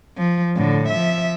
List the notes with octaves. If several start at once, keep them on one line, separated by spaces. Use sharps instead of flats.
F3
A2 D3
F3 E5